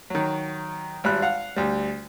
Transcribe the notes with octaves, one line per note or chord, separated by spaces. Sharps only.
D#3 F#3
G#1 G3 B5 F#6
F5 F#5
D2 G3